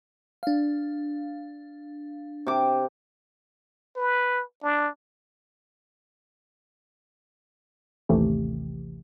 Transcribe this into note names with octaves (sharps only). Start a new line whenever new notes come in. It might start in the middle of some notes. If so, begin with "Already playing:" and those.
D4 F5
C3 D6
B4
D4
A1 D#2 C3 E3 A3 G4